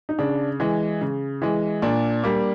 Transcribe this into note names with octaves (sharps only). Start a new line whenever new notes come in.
D#4
C#3 D4
E3 G#3
C#3
E3 G#3
A#2 D4
G3 A#3